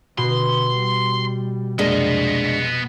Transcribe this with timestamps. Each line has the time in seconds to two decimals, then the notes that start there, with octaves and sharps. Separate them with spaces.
0.18 B2 D3 C6
0.76 G3
1.79 C2 F2 G#3 A#3 B3 D4 D#5